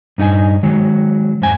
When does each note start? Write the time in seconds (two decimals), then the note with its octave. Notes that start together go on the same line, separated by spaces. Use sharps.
0.18 G2 D#4 F#4 G#5
0.63 D#3 F#3 G#3
1.42 F2 G#2 G#5